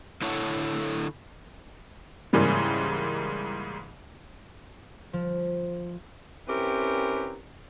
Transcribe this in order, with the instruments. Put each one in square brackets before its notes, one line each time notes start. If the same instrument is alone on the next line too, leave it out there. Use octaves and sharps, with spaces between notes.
[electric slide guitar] D3 E4 A4 C#5 F#5
[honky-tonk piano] G#2 C#3 E3 G3 A#3
[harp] F3
[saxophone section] C4 C#4 E4 G4 A#4 B4